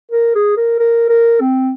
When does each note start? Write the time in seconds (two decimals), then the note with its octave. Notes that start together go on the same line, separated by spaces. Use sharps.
0.11 A#4
0.35 G#4
0.57 A#4
0.79 A#4
1.09 A#4
1.40 C4